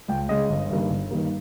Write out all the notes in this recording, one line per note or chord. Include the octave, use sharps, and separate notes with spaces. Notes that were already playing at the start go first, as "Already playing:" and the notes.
C#2 G5
C#3 G#3 D#5
G1
G2 D#3 G3 A#3
G1
G2 D#3 G3 A#3